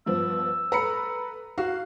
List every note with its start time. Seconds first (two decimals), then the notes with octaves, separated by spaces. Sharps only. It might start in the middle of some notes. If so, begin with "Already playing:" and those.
0.06 G2 F3 B3 E6
0.72 A4 B4 A#5 B5 C#7
1.58 F#4 F5